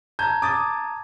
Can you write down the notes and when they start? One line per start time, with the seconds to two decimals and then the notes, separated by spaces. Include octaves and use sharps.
0.19 A5 A#5 G6 G#6
0.42 D6 D#6 A6